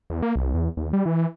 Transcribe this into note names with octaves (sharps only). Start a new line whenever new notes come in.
E2
A#3
C2
E2
D#2
G3
E3